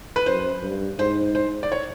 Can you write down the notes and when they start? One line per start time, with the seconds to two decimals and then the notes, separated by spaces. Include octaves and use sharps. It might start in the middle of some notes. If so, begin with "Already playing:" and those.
0.16 B4
0.26 F#2 C5
0.63 G2
0.98 G#2 C5
1.35 C5
1.63 D5
1.72 C#5